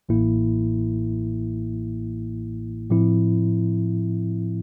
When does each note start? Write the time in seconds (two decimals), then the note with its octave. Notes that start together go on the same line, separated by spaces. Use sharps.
0.09 A1 A2 E3 A#3 E4
2.90 A2 F3 C4 E4